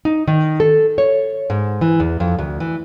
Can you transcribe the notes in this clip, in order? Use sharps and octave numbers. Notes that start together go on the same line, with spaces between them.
D#4
D#3
A4
C#5
G#2
E3
E2
F2
D2
E3